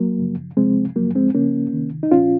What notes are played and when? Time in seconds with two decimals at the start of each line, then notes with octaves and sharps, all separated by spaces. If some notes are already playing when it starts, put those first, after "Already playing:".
Already playing: F#3 A#3
0.19 F#2 C#3 F3
0.57 C#2 C3 F3 G#3 C4
0.96 F#2 C#3 F3 F#3 A#3
1.15 G#3 C4
1.34 C#2 C#3 F3 A#3 C#4
1.73 C#2 C3 D#3
2.03 D#4
2.11 C2 A#2 F3 C#4 F4